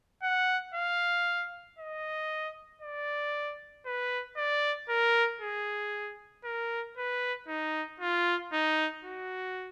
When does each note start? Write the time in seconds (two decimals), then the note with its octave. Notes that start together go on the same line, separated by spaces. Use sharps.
0.23 F#5
0.74 F5
1.78 D#5
2.82 D5
3.86 B4
4.37 D5
4.90 A#4
5.41 G#4
6.45 A#4
6.97 B4
7.48 D#4
8.00 F4
8.53 D#4
9.04 F#4